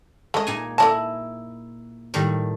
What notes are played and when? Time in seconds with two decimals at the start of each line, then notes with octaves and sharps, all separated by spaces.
0.34 G#3 A3 D#5
0.47 A#2 D#4 G#5
0.78 E4 A4 D5 D#5 A5
2.14 A2 D#3 G3